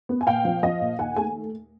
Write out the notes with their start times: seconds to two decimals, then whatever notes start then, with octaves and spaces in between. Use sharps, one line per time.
0.09 B3
0.21 G#5
0.27 A#2 F5 G5
0.45 F3
0.63 F3 D#5 F5
0.81 A#2
0.99 D#2 F#5 G#5
1.16 A3 G#5